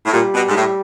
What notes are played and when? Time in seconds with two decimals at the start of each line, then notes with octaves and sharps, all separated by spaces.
0.05 A2
0.13 A#2 G3
0.34 B2
0.48 G#2
0.56 A2